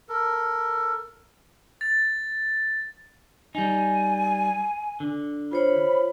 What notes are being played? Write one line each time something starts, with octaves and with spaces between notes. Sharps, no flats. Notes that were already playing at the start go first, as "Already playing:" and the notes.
A4 A#4
A6
G3 D#4 G#5
D3
F4 C5 C#5 B5